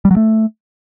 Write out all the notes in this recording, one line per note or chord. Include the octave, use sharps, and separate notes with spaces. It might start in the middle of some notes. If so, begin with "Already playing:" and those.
G3
F#3
A3